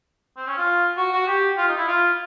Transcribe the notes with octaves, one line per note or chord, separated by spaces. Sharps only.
C4
C#4
F4
F#4
F#4
G4
F4
D#4
E4
F4